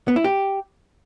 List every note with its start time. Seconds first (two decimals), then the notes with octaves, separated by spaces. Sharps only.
0.08 B3
0.16 E4
0.24 G4